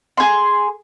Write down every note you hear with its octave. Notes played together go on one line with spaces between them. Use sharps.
G#4 C6